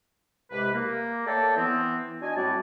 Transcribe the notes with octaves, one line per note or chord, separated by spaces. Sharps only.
C2 C3 G#3 G4 B4
A#3
A4 C#5 D5 E5 G5 A5
E3 B3 C4
D4 F#4 D#5 G#5
A2 G3 C4 F#4 D5 A5